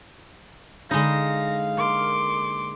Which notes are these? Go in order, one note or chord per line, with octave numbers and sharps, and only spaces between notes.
D3 G#3 D#4 F5 B5 A#6
A#3 C6 D6